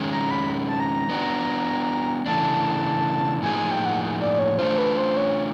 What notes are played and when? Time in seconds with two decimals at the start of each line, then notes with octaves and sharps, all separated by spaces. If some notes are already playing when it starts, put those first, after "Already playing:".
Already playing: D#3 G#3 C#4
0.12 A#5
0.31 B5
0.68 A5
0.80 A#5
1.09 B3 D4 F#4
2.26 C#3 E3 A3 D4 A5
3.42 A2 F3 A#3 D#4 G#4 G#5
3.56 G#5
3.71 G5
3.85 F#5
4.20 D5
4.39 C#5
4.58 A3 D4 F4 C5
4.78 B4
4.97 C5
5.17 C#5